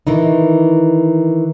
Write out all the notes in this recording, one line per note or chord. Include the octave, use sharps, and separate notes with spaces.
D#3 E3 D#4